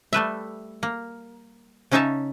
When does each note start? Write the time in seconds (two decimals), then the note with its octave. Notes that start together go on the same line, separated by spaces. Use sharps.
0.13 G3 A3 B4 E5
0.83 A#3
1.91 C#3 C#4 D#4 C#5 E5 A5